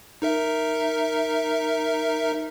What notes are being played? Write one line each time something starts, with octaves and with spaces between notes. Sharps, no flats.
D#4 A#4 E5